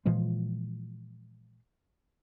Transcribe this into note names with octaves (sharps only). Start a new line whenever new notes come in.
A#2 E3 F3 G#3